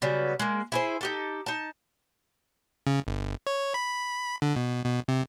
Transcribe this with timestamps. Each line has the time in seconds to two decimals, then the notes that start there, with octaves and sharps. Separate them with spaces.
0.02 C#3 F#3 G3 B3
0.39 G#3 A#3
0.72 E4 G#4 C5
1.01 D#4 G4 A4
1.46 D#4 A5
2.87 C#3
3.07 G1
3.47 C#5
3.74 B5
4.42 D3
4.56 B2
4.85 B2
5.08 C3